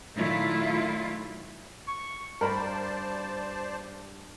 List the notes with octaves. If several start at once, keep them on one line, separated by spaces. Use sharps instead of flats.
A#2 D#3 F#3 A3 E4 F4
C#6
G2 A#4 C5 D5 A5 B5